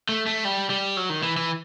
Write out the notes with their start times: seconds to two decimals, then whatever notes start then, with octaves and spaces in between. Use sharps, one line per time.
0.09 A3
0.26 A3
0.45 G3
0.70 G3
0.97 F#3
1.10 D#3
1.23 E3
1.37 E3